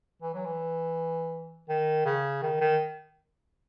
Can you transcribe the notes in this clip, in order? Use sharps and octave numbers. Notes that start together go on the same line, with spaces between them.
E3
F#3
E3
D#3
C#3
D#3
D#3